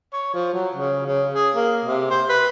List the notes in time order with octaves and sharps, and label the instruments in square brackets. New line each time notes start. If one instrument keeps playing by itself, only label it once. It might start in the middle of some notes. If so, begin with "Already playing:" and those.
[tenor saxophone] C#5
F3
F#3
C#3
C#3
G#4
A#3
C3
C5
B4